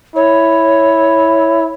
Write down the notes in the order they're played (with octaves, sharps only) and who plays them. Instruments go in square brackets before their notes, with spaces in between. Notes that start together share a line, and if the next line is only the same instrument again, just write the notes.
[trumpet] E4 [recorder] C#5